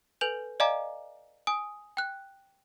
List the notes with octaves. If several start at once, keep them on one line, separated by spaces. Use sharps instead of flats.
A4 B4 G#5 G6 F7 F#7
D5 D#5 F5 G#5 A#5 D6
G#5 D#6
G5 F#6